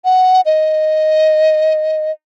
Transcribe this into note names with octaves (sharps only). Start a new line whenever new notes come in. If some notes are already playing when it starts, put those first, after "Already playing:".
F#5
D#5